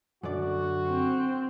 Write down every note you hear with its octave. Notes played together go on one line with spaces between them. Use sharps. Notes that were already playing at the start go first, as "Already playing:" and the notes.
F#2 D3 F#4 D5
C4